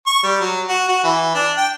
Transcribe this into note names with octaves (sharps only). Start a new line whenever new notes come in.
C#6
G3
F#3
F#4
F#4
E3
D4
G5